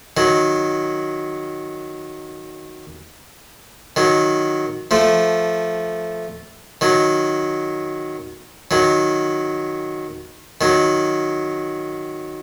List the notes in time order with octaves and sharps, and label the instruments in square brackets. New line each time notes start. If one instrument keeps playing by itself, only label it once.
[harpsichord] D#3 F#3
D#3 F#3
F3 A3
D#3 F#3
D#3 F#3
D#3 F#3